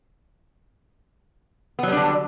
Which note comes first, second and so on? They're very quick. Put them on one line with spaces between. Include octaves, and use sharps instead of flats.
B3 F#3 G3 D4 D3